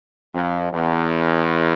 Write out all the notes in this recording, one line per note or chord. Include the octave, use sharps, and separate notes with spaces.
F2
E2